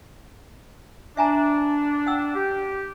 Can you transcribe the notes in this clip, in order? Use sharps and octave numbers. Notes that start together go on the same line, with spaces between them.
D4 E5 G#5 A#5
F#5 G5 E6
G4